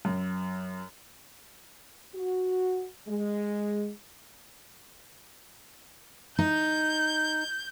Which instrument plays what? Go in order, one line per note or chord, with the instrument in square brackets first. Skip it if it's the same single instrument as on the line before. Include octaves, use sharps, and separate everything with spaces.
[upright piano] F#2
[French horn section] F#4
G#3
[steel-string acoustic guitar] D#4 [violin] G6